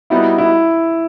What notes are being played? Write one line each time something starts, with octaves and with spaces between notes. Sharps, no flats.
G3 B3 D#4 E4 F#4
E4